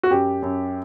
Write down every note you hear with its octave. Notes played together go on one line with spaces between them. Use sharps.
F#4
F#2 G4
F#2